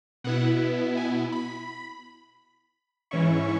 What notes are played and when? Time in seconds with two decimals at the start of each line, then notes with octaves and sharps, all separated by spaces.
0.24 B2 B3 E4 F#5
0.97 G#5
1.32 B5
3.11 G#2 E3 C#4 E4 C#6